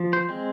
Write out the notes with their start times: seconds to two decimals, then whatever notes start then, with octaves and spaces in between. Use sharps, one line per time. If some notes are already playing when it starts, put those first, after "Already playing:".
Already playing: F3
0.13 C5
0.29 G#3 C4